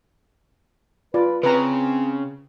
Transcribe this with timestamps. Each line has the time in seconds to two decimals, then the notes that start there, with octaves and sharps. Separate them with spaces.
1.14 F4 B4 D5
1.43 C#3 C4 B4 A#5